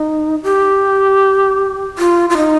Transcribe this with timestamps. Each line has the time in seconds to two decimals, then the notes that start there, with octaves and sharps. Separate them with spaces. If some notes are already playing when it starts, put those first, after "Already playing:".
Already playing: D#4
0.43 G4
1.98 F4
2.30 F4
2.37 D#4